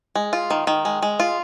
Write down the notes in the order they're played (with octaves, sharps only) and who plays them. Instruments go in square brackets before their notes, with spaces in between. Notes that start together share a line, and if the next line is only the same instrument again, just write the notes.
[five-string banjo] G#3
F4
D#3
D#3
G#3
G#3
F4